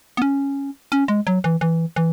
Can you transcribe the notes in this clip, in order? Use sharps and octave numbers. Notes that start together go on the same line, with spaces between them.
B3
C#4
C#4
G#3
F#3
E3
E3
E3